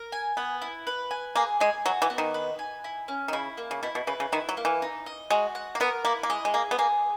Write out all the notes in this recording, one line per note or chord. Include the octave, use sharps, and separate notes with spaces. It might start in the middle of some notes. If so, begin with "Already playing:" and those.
Already playing: A#4
G#5
B3 B4
E4
B4
G#5
A#3 G#4
G#3 G#5
F#3 F#4
E3
B3
D#3
B4
G#5
E4
C#4
D#3
C#3 E4
A#3
C#3
B2 E4
B2
C#3 B4
C#3
D#3 E4
F#3
A#3
E3
D#4
D#5
G#3 F#4
F#5
A#3
B3 A#4
A#3 E4
A#3
G#3 D#5
G#3
A#3 G#4
B3
A#3 G#4